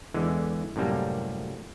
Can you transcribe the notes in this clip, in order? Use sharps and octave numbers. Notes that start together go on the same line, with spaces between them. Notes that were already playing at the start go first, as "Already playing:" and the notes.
E2 D3 E3 G#3
F#2 A2 C3 G3 A#3